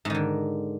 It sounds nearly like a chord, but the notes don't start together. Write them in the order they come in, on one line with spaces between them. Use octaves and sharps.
G#2 D#3 D3